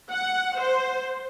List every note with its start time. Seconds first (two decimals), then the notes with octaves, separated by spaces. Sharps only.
0.10 F#5
0.59 C5